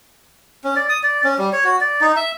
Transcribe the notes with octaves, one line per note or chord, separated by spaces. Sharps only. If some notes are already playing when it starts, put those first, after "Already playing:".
C#4
D5
D#6
D5
C#4
G3
C#5
F#4
D5
D#4
E5